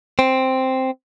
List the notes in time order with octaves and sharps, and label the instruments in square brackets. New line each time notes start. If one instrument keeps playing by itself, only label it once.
[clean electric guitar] C4